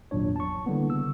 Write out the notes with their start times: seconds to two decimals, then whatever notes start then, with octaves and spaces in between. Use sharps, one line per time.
0.11 G#1 E2 A#2 F#3 D4 C#5
0.36 A5 C#6
0.66 D3 E3 G3 A#3 B3
0.90 C#3 E6